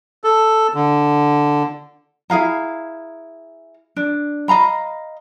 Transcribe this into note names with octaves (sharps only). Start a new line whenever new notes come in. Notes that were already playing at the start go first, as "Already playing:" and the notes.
A4
D3
E4 G#4 F5 A#5
D4
D#5 F5 A#5 B5